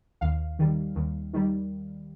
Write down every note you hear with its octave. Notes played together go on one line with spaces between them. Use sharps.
D#2 F5
D#3 G3
D#2
D#3 G3